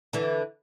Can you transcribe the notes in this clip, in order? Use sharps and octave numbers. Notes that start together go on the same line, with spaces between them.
D3 E3